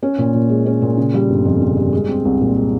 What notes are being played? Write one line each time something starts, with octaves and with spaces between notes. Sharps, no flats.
C#4
A#2
A#2
G#3
C#4
A#2
C#3
G3
G1
F2
C#3
G3
G#3
C4
C2
A#2
G#3